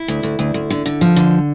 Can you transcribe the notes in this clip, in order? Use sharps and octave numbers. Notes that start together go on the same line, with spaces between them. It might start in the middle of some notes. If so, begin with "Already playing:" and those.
Already playing: E4
D2
D2
D2
D2
D3
D3
F3
D3